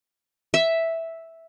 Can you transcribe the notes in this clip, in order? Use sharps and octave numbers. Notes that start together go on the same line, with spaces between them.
E5